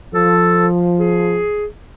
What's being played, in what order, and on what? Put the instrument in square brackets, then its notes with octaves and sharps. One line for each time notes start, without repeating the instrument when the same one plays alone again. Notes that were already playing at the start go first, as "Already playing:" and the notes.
[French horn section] F3 [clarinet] A4
[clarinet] G#4